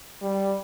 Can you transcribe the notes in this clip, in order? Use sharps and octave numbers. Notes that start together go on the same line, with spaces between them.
G3